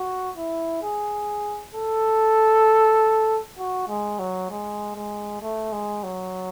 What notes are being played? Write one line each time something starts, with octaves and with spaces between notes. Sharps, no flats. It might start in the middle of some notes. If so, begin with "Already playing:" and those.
Already playing: F#4
E4
G#4
A4
F#4
G#3
F#3
G#3
G#3
A3
G#3
F#3